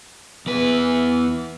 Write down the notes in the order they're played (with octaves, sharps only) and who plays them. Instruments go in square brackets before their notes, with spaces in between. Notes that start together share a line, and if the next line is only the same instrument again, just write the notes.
[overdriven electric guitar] E2 B4